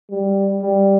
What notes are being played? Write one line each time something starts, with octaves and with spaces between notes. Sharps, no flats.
G3
G3